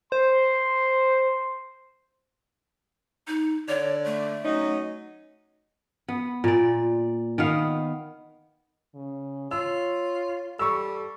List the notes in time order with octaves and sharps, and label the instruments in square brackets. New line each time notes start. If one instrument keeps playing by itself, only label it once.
[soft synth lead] C5 [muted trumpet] C6
[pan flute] D#4
[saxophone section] D3 D5 [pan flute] C#5
[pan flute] A3
[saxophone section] F#3 C#4 D#4
[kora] B3
A#2 D5
D#3 B3 F5
[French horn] C#3
[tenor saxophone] F4 [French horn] C#5 [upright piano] E6
[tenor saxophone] G3 [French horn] A4 [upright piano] C#6 E6